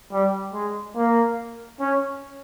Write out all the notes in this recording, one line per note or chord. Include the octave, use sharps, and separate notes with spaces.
G3
G#3
A#3
C#4